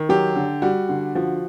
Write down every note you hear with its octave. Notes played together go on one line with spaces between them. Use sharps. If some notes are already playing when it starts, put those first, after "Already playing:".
Already playing: D#3
F#3 G4
D3
G3 F#4
D3
F3 F#4